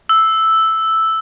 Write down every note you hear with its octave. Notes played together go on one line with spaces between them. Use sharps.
E6